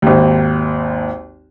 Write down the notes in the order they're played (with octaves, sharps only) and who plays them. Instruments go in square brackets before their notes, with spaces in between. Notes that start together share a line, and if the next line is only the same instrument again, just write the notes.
[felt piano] G#1 D#2